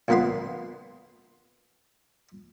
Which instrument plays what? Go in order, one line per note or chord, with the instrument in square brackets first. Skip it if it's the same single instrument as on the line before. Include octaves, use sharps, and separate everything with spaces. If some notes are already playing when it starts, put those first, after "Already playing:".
[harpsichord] A#1 F2 A#3 B3 B4 C6